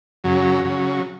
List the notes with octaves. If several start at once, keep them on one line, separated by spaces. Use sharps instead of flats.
F#2 C#3 F#3
C#3 F#3